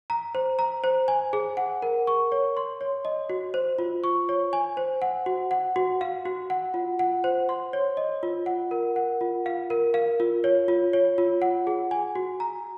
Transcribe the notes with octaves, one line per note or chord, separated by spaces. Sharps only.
A#5
C5
A#5
C5
G#5
G#4
F#5
A#4
C#6
C#5
C6
C#5
D#5
F#4
C5
F4
C#6
C#5
G#5
C5
F#5
F#4
F#5
F#4
F5
F#4
F#5
F4
F#5
C5
C6
C#5
D#5
F4
F#5
A#4
F#5
F4
F5
A#4
F5
F4
C#5
F4
C#5
F4
F#5
G#4
G#5
F#4
A#5